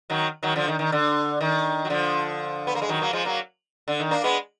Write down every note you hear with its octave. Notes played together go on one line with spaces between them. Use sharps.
D#3 F#3
D#3 F#3
D3 F3
D#3
D#3
D3
D#3
F#3
D3 F3
B3
A#3
G#3
D#3 F#3
F#3 A#3
F3 G#3
F#3 A#3
D3
D#3
A#3 D4
G#3 B3